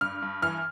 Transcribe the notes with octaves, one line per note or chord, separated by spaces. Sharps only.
G2 F6
G2
E3 F6